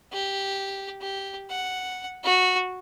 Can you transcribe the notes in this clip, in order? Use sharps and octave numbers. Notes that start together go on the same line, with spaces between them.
G4
G4
F#5
F#4